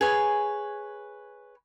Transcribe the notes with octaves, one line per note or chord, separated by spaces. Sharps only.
G#4 B4 C#5 G#5